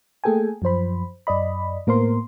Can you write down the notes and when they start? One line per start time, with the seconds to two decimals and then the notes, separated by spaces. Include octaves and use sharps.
0.24 A3 A#3 G#4 A4 G5 G#5
0.62 F#2 F3 C5 B5
1.27 F#2 D5 D#5 B5
1.87 A2 A#3 B3 A#4 C5 C6